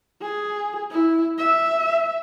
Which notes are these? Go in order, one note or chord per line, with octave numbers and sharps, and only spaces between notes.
G#4
E4
E5